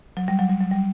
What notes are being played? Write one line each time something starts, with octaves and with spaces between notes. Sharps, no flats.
F#3
G3
F#3
G3
F#3
G3